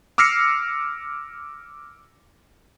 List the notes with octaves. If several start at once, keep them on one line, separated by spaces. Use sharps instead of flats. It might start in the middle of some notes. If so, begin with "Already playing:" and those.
D6 E6 F6 A#6 C7 C#7